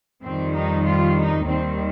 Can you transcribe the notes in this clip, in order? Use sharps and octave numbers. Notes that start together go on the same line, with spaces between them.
F2 D#3 G3 C4
D#4
F4
D#4
D#2 D#3 G3 C4